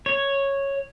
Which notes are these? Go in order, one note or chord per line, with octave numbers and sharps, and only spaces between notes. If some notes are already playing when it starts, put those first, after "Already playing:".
C#5